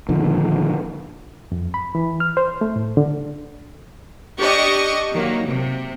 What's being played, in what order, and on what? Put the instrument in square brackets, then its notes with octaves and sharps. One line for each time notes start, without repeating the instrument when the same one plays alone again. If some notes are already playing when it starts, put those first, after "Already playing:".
[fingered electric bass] A#2 D3 D#3 F3
[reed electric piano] F2
B5
E3
F6
C5
A3
A2
D3
[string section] D4 G4 D#5 C#6
D#3 F#3 A#3
C3